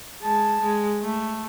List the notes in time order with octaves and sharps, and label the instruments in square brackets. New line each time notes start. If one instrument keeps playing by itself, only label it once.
[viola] G#3 A5
G#3
A3